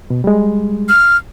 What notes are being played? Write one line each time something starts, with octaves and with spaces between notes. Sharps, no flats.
B2
G3 G#3
F6